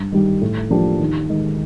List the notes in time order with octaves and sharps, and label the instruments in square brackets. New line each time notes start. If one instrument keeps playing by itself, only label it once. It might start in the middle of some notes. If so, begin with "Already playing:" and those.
Already playing: [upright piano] G2
D#3 G3
A2
F3 A#3 D4 G4
D#2
D#3 G#3